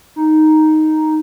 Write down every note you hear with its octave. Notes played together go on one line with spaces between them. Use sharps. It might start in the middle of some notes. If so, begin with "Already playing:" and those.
D#4